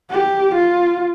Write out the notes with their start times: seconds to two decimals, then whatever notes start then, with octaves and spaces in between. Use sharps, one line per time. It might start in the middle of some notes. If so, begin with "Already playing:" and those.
0.11 G4
0.55 F4